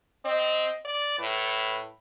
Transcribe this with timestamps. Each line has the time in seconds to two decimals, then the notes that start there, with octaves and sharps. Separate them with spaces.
0.25 C4 D#5
0.85 D5
1.19 A2 B4